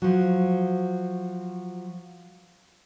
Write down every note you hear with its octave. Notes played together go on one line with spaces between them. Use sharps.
F3 F#3